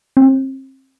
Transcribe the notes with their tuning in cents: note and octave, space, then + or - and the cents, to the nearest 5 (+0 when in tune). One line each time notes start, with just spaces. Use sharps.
C4 +35